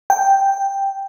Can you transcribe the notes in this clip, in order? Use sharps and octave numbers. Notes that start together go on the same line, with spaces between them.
G5